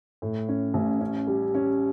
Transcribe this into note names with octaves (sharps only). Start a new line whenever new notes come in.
A2
C#4
A1
C#4
G3
C#4